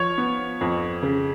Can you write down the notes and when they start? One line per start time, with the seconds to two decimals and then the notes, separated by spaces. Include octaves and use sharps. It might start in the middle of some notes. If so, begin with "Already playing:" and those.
Already playing: F3 C#5
0.18 B3
0.61 F2
1.03 C#3